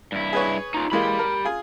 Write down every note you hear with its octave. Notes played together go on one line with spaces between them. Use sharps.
G2 E4
G#4 B4 C#5
D#4 F4
E3 G#3 A#3 G4 B5
A#4
F4 G#4